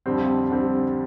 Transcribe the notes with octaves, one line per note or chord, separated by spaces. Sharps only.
F2 D3 G3 C4
D3 G3 C4